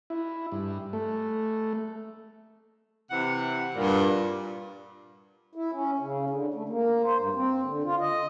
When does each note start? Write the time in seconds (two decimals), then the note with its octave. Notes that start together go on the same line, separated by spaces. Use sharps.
0.10 E4
0.52 G2
0.93 A3
3.10 C3 E3 F#5
3.75 G2 A#2
5.55 E4
5.73 C#4
5.99 C#3
6.30 D3
6.54 A3
6.69 A#3
7.04 C5
7.18 G2
7.35 C4
7.65 D3
7.84 F4
8.00 D#5